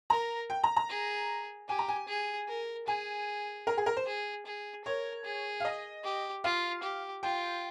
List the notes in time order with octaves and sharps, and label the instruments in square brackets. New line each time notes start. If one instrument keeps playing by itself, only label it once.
[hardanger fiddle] A#4 [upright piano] A#5
[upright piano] G5
A#5
A#5
[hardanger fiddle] G#4
[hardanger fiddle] G4 [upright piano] G#5
[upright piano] A#5
G#5
[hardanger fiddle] G#4
A#4
[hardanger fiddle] G#4 [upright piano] G#5
[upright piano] A#4
G#4
A#4
C5
[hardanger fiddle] G#4
G#4
[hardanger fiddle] A#4 [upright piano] C#5
[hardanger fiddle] G#4
[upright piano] F5
D#5
[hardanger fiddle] G4
[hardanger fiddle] F4 [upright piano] F5
[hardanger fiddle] G4
[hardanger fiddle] F4 [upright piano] G5